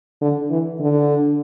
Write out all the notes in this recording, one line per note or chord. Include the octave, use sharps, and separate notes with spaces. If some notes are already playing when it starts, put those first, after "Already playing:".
D3
E3
D3